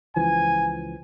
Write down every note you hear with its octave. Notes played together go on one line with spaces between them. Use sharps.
C#2 E3 F3 G#5